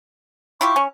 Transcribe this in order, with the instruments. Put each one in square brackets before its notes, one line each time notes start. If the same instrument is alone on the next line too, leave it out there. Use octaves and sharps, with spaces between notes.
[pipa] E4 F4 G4 [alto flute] C#6
[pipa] C#4